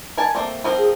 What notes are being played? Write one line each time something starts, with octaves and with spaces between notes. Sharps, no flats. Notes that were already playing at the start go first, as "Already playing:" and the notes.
A#4 G#5 A5
A3 A#3 C4
F3 C4 A#4
G#4